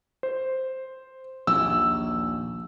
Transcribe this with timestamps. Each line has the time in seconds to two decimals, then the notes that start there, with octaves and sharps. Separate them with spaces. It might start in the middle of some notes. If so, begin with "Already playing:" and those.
0.23 C5
1.47 A#1 D#2 E6